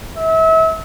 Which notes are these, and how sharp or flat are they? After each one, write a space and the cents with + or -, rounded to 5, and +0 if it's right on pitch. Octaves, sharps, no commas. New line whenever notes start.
E5 -35